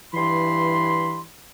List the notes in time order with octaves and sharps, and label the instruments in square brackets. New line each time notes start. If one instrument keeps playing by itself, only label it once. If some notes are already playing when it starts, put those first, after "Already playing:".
[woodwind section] G2 B5 C6 [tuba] E3